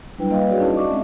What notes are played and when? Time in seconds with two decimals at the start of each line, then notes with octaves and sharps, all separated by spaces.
0.18 F#3 G3 D4 E4 B4 G5
0.30 G3 A#3 B4 D#5 F5
0.48 F#4 G#4 B4 C#5 D5 F5
0.60 C#4 D#4 E4 D#5 A5
0.76 D5 D#5 C#6 D6
0.89 G#3 C4 E5